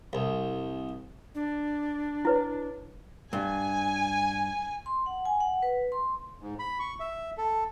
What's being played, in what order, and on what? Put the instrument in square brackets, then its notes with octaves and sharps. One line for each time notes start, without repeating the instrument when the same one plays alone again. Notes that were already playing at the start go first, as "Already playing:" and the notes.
[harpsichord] C2
[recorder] D4
[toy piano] E4 B4 C#5
[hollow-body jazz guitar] G2 [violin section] G#5
[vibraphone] C6
F#5
G#5
F#5
B4
C6
[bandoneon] G#2
B5
C#6
E5
A4